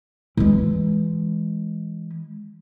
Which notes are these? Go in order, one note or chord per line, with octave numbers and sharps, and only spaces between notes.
E3 G#3